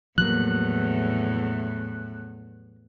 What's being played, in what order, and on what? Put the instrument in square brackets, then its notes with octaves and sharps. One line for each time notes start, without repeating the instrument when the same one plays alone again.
[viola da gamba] E2 A2 [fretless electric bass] F3 F#3 A#3 [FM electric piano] F#6